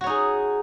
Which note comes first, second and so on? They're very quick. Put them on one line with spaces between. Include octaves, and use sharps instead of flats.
F#4 C#5 D#4 G#4